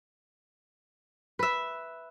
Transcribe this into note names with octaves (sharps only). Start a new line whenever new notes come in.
B4 E5